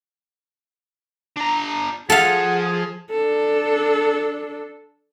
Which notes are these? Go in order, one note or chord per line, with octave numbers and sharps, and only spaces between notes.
D4 A#5
F3 G#4 A4 F5 F#5
D4 A4